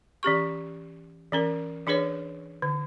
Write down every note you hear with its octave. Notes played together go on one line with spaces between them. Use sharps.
E3 C#4 G4 C#6
E3 C#4 A#4
E3 D4 G#4 B4 C#5
D3